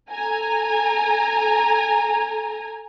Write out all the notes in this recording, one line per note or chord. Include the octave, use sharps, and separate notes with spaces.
A4 G#5 A#5